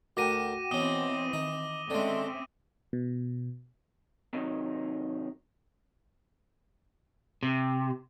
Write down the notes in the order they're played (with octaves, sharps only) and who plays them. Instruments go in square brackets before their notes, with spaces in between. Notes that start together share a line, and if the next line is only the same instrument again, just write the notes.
[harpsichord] D2 A#4 [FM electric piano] F#4 F#5 G5 [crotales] D6 A#6 D#7
[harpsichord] B2 C#4 [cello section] E3 C4 [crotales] D#6 D#7 G7
[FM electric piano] D#3 [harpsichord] D#4
[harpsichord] D3 G#3 [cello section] C4 C#4 E5
[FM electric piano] B2
[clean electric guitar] C3 D#3 F#3 D#4
[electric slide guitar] C3